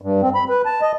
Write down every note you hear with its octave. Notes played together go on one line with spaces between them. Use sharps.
G2
C4
B5
B4
A5
D#5